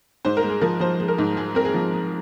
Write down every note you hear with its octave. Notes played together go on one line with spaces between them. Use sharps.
G#2 C5
A#4
G#3
G#4
F3 A#4
F3 C5
G#3
A#4
G#2
G#3 G#4
C4 A#4
G#4
F3
G#3